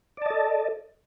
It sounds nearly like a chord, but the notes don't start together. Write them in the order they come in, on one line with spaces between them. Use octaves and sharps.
D5 A5 D#5 A4